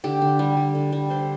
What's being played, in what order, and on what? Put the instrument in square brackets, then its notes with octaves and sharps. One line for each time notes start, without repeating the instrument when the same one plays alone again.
[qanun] D3 G4
D3
G3
G3
D3
G3
D3 C5